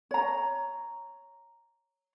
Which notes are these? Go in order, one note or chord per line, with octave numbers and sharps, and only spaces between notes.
C#5 A#5